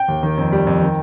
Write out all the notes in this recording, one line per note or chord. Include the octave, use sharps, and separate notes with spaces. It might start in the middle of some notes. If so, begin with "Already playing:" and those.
Already playing: G5
D#2
D#3
F2
G3
F2
D#3